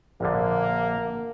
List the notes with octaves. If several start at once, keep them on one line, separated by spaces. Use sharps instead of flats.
A#1 D3 A#3